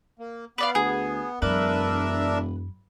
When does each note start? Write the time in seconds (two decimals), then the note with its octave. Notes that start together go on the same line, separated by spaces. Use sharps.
0.19 A#3
0.58 B3 B4 D5 F5
0.75 D2 G#4
1.42 E1 F#2 D4 A#4 B4 E5